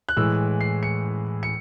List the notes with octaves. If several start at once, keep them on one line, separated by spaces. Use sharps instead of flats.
F#6
A2 E3 G#3 E6
C7
C#7
C#7